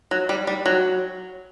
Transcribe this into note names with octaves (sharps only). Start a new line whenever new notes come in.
F#3
G3
G3
F#3